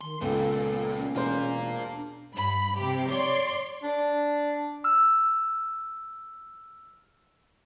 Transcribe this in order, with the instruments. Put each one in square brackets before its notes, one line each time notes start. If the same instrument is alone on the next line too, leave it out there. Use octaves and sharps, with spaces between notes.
[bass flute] D#3 [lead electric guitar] C6
[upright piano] C#2 B3 [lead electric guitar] A#2 [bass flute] A4
[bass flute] C#4
[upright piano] E1 C5 [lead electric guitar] F4 A#4
[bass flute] D4
[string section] G2 B5
C3 G4
C#5 D5 C6
[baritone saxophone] D4
[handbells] E6 F6